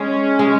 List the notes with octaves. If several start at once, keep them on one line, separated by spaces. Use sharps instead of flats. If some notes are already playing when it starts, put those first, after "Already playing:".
Already playing: G#3 C#4
G#3